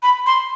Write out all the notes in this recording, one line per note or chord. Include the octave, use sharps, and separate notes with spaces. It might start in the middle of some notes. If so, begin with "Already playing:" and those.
B5
C6